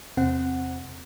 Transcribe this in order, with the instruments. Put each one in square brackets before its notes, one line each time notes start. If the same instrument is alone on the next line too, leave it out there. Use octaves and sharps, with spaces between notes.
[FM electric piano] E2 C3 C4 F#5